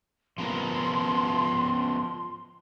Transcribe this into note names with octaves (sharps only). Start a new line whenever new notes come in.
F3 B3 A#4 C6